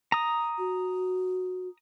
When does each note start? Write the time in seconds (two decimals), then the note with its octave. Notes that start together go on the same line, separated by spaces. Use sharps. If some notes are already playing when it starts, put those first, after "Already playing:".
0.12 A#5 D#6
0.58 F#4